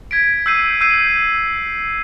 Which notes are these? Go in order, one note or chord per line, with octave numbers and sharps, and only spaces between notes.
G#6 B6 D7
E6 G6 C7 D#7
E6 G6 C7 D#7